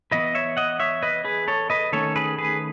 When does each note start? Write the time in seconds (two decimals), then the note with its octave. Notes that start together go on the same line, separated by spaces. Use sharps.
0.11 E3 B3 B4 D#5
0.35 C#5 E5
0.57 D#5 F#5
0.80 C#5 E5
1.03 B4 D#5
1.25 G#4 B4
1.48 A4 C#5
1.70 B4 D#5
1.92 D#3 A3 C#4 A4 C#5
2.16 G#4 B4
2.38 G#4 B4